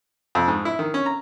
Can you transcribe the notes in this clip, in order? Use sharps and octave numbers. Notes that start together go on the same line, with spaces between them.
F2
G#2
E4
D#3
C#4
A#5